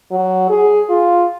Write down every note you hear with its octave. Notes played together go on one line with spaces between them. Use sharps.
F#3
G#4
F4